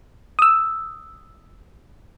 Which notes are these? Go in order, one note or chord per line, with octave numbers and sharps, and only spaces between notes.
D#6 E6